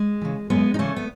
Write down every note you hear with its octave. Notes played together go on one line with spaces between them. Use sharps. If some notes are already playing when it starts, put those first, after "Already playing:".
Already playing: G#3
C#3 E3
F#2 G#3 B3
D#4
C#3 E3 A3 C#4
B3